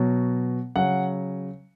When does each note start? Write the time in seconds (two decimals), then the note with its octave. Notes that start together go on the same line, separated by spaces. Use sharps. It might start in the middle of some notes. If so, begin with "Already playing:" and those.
Already playing: B2 F#3
0.76 C#3 F#3 F#5